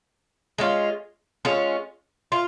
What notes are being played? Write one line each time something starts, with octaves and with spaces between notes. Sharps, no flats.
G#3 C#4 F4
G#3 C#4 F4
F4